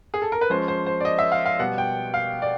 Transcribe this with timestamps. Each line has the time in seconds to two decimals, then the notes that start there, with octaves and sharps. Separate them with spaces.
0.14 G#4
0.22 A4
0.32 A#4
0.41 B4
0.50 F3 G#3 C#4 C5
0.68 C5
0.86 C5
1.00 D5
1.05 D#5
1.19 E5
1.32 F5
1.46 F5
1.59 B2 G3 B3 F#5
1.78 G5
2.14 F5
2.42 D5